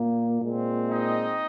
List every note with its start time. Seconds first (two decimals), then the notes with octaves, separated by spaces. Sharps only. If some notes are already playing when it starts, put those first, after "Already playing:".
Already playing: A#2 A#3
0.42 A#2 G#3 C4
0.90 D#4 D#5